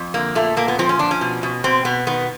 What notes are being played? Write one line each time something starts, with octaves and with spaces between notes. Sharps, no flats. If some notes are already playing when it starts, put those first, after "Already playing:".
Already playing: F2
D3 A#3
A#2 A3
A#2 A#3
B3
F3 C4
C#4
F3 D4
C#4
B2
B2
B2 C4
B2 B3
D#3 B3